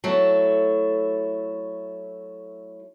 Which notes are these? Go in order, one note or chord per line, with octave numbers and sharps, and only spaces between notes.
F#3 A3 E4 A4